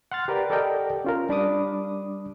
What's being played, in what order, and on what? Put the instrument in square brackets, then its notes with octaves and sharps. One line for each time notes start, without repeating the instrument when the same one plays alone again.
[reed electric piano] F#5 C6 F6 A6
G4 A#4 B4 D5 F#5 G5
G4 A4 A#4 D5 D#5 G5
C#4 F4 A#4
G3 D4 B5 D6 D#6